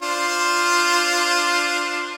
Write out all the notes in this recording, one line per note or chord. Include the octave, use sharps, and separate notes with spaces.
D4 F4 C5